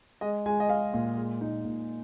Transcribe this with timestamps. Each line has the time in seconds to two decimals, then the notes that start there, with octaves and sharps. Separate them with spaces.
0.21 G#3 D#5
0.46 G#3 G#5
0.60 D#5
0.69 G#3 F5
0.94 A#2
1.17 G#3
1.41 A#2 D#4
1.65 A#2